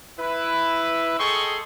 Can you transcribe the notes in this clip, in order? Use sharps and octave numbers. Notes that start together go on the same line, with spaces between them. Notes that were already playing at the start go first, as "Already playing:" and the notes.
E4 B4
G#4 A4 D#5 G5 C6 C#6